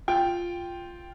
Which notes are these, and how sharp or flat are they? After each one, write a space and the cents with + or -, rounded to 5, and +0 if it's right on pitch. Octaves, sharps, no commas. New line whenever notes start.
F4 +0 G5 +0